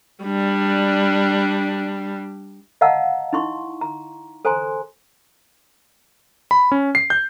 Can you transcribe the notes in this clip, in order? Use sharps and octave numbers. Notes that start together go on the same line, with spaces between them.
G3 D4
D#5 F5 F#5 A5 A#5 E6
D#4 E4 C6 C#6
A#5
A4 C5 G#5 A#5 C6
B5
C#4
C7
G6